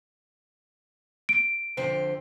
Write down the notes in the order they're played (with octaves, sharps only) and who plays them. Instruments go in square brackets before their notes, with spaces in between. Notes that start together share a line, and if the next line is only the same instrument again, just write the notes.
[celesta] D7
[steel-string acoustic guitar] F2 D3 C5